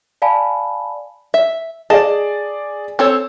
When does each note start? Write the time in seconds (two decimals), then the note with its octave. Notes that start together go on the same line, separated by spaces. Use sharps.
0.22 D5 F5 G#5 A5 B5
1.34 E5
1.90 G#4 D5 D#5 A5
2.99 C4 A4 C#5